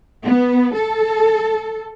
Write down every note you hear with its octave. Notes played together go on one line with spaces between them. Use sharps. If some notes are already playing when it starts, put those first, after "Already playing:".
B3
A4